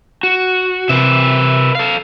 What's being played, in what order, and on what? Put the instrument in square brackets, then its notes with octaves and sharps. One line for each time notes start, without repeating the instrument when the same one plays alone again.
[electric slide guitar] F#4
[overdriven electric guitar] C3 [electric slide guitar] A#4 B4 E5
[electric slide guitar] A4 F5